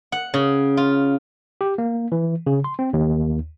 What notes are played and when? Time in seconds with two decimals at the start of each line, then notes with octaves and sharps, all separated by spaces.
0.12 F#5
0.34 C#3
0.77 F4
1.61 G4
1.78 A#3
2.12 E3
2.47 C#3
2.64 C6
2.79 C4
2.93 D#2